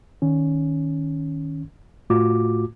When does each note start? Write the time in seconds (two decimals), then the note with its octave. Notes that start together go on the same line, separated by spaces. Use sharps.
0.22 D#3 C#4
2.10 A2 A3 F4 F#4 D6